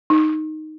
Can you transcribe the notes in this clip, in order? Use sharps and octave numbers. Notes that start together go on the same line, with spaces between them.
D#4